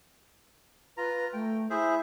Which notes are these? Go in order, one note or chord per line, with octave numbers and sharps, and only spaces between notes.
F4 B4 A#5
A3 G5
E4 G#4 C5 E5